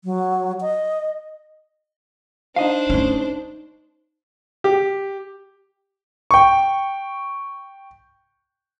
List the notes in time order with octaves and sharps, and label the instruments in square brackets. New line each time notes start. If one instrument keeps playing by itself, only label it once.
[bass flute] F#3
D#5
[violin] D4 C5 [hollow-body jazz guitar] D#4 D#5 F5
[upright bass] A3 C#4
[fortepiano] G4
[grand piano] G5 C#6